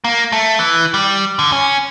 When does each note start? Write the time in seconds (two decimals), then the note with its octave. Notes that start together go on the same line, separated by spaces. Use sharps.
0.04 A#3
0.32 A3
0.59 E3
0.94 G3
1.39 D3
1.52 C#4